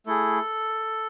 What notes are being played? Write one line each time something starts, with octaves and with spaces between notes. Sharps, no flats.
A3 E4 G#4 A4